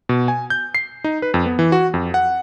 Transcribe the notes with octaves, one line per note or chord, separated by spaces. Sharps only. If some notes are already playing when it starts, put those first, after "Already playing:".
B2
G#5
G6
C7
D#4
B4
F2
B3
E3
F#4
F2
F#5